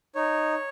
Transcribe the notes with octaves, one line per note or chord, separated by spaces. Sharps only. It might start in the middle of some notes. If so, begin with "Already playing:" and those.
D#4 C#5